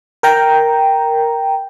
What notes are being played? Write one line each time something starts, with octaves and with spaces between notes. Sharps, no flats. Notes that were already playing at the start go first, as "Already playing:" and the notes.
A#4 G5 A#5